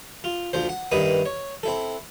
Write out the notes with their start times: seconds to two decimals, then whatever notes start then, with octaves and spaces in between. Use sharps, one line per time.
0.24 F4
0.53 D2 F3 C5
0.69 F#5
0.92 G2 D#3 E4 B4 D#6
1.26 C#5
1.63 C4 E4 A4